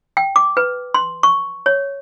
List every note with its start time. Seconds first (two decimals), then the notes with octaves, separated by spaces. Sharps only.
0.17 G5
0.36 D6
0.57 B4
0.94 C6
1.23 C#6
1.66 C#5